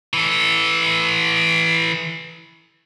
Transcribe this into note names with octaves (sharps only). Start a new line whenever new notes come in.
E3 A4